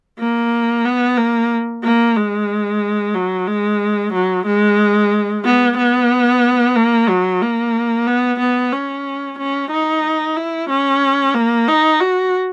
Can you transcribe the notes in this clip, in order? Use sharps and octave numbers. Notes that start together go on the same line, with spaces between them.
A#3
B3
A#3
A#3
G#3
F#3
G#3
F#3
G#3
B3
B3
A#3
F#3
A#3
B3
B3
C#4
C#4
D#4
E4
C#4
A#3
D#4
F#4